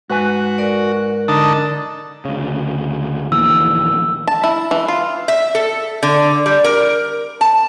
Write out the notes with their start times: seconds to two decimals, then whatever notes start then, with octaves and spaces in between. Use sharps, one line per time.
0.10 G#2 F#4 B4 G#5
0.58 A#4 D5
1.28 D3 D#4 A5
2.25 D2 C#3
3.32 A#1 D#2 E3 E6
4.27 A5
4.44 E4
4.71 E3
4.88 F4
5.28 E5
5.55 A4
6.03 D3
6.46 G3
6.64 A#4
7.41 A5